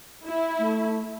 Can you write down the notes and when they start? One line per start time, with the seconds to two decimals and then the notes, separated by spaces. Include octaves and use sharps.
0.27 E4
0.59 A3